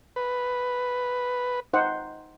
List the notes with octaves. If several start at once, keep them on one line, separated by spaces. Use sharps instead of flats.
B4
D#4 C5 F#5